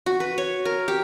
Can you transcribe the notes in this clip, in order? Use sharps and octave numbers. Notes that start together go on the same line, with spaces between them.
F#4
B4
C#5
A#4
G4